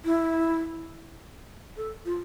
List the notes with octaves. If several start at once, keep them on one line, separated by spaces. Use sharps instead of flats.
E4
A4
F4